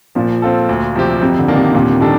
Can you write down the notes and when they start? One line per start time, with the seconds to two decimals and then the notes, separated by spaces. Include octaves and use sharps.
0.15 A#2 F3
0.42 C4 F4 A4
0.69 D2
0.95 C3 F3 C4 G4
1.22 F2 C3
1.39 D3
1.48 D#3 A#3 D4
1.57 C3
1.74 D#2 A#2
2.00 C3 D#3 G3 D4 A4